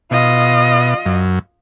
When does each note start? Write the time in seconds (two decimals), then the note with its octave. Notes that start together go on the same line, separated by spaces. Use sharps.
0.11 B2 F4 D#5
1.06 F#2